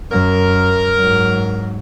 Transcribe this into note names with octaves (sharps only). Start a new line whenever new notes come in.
F#2 A#4
G#2 F#3